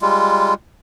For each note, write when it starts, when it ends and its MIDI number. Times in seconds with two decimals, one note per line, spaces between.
0.01 0.54 55
0.01 0.54 56
0.01 0.54 65